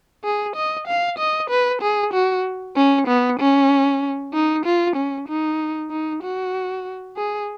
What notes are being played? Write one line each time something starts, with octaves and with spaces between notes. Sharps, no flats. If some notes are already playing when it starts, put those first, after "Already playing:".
G#4
D#5
F5
D#5
B4
G#4
F#4
C#4
B3
C#4
D#4
F4
C#4
D#4
D#4
F#4
G#4